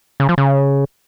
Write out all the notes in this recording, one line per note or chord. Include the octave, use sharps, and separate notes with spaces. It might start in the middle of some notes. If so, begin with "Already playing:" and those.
C#3
F3
C#3